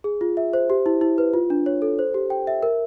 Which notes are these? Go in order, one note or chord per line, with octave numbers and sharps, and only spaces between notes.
G#4
F4
E5
C5
G4
E4
E4
B4
F4
D4
C#5
A4
C5
G4
G5
E5
A#4